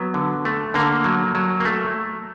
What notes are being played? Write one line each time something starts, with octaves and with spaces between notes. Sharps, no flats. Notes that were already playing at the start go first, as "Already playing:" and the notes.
Already playing: F#3 B3
D3
A3
D3 A#3
F#3
F#3
A#3
A3